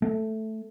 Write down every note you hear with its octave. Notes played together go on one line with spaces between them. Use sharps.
A3